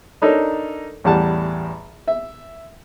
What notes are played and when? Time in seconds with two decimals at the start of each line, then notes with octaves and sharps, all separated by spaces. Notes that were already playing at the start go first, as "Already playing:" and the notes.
0.22 D4 D#4 A4 A#4 C#5
1.04 A1 E2 G3 F#5 A5
2.08 E5